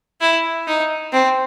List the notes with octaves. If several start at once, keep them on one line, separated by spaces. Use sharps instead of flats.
E4
D#4
C4